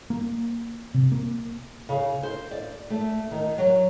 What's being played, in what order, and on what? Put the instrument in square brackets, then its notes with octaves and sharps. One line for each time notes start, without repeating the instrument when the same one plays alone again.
[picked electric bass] A#3
C3
A#3
[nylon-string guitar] C#3
C5
D5
A3
D#3
F#3